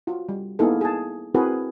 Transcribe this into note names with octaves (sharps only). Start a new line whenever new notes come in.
F4 F#4
G3
A#3 B3 D#4 E4 G#4 A4
G#4 A5
C4 E4 F#4 G#4 A#4 B4